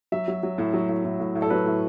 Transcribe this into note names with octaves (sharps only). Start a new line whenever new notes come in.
F#3 E5
F#3
F#3
A2
F#3
A2
A2
A2
A2
A4
F#3 B4
A2